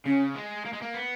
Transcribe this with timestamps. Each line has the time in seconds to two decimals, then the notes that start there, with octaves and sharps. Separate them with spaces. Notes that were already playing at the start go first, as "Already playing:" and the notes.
0.05 C#3 C#4
0.35 G#3
0.65 A#3
0.73 G#3
0.82 A#3
0.94 B3